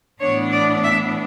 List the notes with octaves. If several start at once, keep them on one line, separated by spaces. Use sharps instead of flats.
A2 E3 B3 D4 C#5
D5
E5